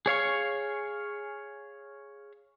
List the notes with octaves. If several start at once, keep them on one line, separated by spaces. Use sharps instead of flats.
G#4 C#5 F5 C#6